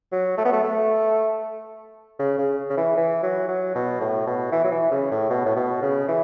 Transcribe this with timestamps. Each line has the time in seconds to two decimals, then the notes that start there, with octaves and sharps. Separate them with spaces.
0.12 F#3
0.38 A3
0.45 B3
0.52 A3
0.64 A3
2.19 C#3
2.38 C#3
2.70 C#3
2.77 E3
2.97 E3
3.23 F#3
3.48 F#3
3.75 B2
4.01 A2
4.27 B2
4.52 E3
4.64 F#3
4.71 E3
4.91 C#3
5.11 A2
5.30 B2
5.46 A2
5.56 B2
5.82 C#3
6.08 E3